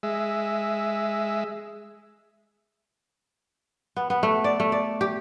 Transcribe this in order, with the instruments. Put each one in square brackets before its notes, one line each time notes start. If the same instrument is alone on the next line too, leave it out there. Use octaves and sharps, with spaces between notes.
[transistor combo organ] G#3 E5
[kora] B3
B3
A3
D5
A3
D5
G4